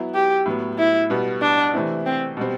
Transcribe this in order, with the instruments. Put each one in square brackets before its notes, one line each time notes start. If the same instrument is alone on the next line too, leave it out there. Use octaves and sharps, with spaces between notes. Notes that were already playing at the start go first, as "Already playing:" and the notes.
Already playing: [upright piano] F#3 B3 E4
[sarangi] G4
[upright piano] A2 F#3 B3
[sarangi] E4
[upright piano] B2 G3 B3
[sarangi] D4
[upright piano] C3 E3 A3 C4 E4
[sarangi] C4
[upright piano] B2 G3 C4